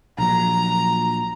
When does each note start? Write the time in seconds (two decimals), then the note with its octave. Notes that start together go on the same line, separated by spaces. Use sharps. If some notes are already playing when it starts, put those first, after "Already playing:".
0.18 A#1 F#3 A#5